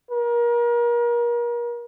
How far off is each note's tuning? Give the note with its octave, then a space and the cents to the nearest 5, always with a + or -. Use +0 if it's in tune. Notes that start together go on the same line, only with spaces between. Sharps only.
A#4 +35